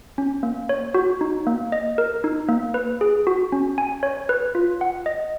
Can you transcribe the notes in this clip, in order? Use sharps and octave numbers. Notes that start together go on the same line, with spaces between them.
C#4
A#3
C#5
F#4
D#4
A#3
D#5
A#4
D#4
A#3
B4
G#4
F#4
C#4
G#5
C#5
B4
F4
F#5
D#5